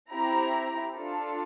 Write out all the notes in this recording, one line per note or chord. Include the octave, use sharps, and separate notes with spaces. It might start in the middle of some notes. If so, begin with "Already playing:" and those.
C4 E4 G4 A#5
D4 F4 A4